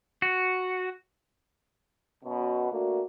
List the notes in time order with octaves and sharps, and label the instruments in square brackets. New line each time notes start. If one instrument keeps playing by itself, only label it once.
[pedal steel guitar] F#4
[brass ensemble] F#2 B2
A3 A#3 D4 F#4